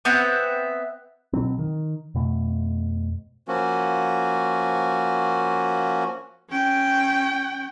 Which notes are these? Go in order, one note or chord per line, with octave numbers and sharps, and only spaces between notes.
B3 C4 E5 F#5
B2 F#3 C4
D#3
F2 B2 A3
F3 A#3 C#4 F#4
C#4 G5